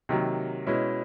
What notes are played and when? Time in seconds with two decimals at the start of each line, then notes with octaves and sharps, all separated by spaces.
0.09 C3 D#3 F#3 A#3
0.67 B2 G#3 C#4 E4